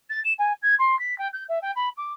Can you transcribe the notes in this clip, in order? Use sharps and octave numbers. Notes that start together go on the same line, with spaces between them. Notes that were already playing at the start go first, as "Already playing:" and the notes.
A6
E7
G#5
G#6
C6
B6
G5
G6
E5
G5
B5
D6